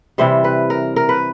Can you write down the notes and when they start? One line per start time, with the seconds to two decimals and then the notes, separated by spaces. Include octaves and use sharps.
0.18 C3 E3 G3 C5
0.44 B4
0.70 A#4
0.96 A#4
1.09 B4